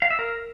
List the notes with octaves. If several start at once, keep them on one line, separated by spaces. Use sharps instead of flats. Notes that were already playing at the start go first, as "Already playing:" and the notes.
F5
E5
A#4